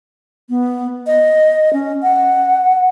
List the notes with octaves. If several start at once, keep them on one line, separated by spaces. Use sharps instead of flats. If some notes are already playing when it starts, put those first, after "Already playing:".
B3
D#5
C#4
F#5